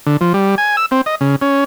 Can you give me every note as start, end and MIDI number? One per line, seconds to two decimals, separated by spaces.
0.06 0.17 50
0.21 0.33 53
0.34 0.55 55
0.58 0.76 80
0.77 0.86 88
0.91 1.01 60
1.06 1.15 75
1.21 1.36 49
1.42 1.64 61